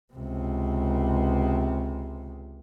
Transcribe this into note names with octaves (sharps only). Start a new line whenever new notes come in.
C#2 C3